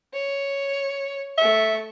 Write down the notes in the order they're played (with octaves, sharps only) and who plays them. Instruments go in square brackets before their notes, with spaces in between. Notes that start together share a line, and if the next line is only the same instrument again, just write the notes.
[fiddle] C#5
[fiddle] A3 C#6 [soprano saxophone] E5